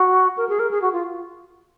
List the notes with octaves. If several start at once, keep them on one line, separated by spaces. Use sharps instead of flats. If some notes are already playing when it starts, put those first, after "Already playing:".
Already playing: F#4
A#4
G#4
A#4
G#4
F#4
F4